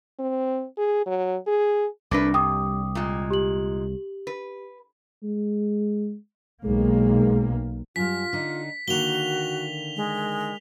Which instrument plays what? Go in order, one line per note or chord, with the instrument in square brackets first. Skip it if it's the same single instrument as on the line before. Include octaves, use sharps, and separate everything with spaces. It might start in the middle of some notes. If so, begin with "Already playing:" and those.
[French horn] C4
G#4
F#3
G#4
[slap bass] C2 [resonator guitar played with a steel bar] A3 D4 B4 [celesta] D6 A#6
[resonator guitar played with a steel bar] G2 [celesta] G5 D6 D#6
[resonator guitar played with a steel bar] A#2 G#3
[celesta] G4 F#7
[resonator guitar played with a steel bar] B4
[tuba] G#3
[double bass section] B1 A#3 [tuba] G#3
[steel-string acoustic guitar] F#2 G3 [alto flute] F4 [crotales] B6
[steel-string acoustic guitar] D3 D#4
[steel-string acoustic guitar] D3 D#3 A#3 [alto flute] F#4 [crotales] F7 G7
[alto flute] G#3